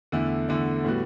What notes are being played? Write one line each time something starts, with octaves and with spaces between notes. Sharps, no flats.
E2 D3 A3 E4
E2 D3 A3 E4
A2 G3 B3 F#4